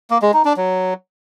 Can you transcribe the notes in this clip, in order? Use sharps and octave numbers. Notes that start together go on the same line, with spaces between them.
A#3
G#3
D#4
D4
F#3